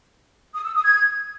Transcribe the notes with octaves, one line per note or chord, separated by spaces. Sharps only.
D#6
E6
D#6
G#6